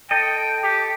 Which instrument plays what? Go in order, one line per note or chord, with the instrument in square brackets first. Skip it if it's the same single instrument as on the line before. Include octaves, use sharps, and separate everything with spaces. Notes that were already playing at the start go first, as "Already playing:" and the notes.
[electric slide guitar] A4 D#5 [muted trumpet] G5
[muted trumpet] G4